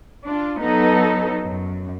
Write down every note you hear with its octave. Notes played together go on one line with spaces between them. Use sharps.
D4 F4
F#3 B3 D#4 A4
F#2